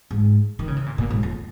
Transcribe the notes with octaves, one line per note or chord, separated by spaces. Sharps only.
G#2
D#3
C#3
C3
A#2
A#2
G#2
F2